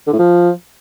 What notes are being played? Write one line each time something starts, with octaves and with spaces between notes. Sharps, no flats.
D3
A2
F3